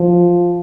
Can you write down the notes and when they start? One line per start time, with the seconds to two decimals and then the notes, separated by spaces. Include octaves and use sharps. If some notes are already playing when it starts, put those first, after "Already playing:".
Already playing: F3